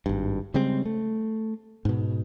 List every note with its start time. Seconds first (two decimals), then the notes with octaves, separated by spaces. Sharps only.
0.06 G#1 G2
0.54 C#3 G3 G#3 C4
0.85 A3
1.85 G#2 B2